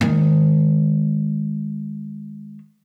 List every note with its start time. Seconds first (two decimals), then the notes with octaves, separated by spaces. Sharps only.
0.01 D#3 G#3